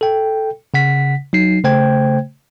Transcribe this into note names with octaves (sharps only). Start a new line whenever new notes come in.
A4 G5
C#3 F#5 B6
F#3 D#4 C7
C#3 A3 C5 G5 G#6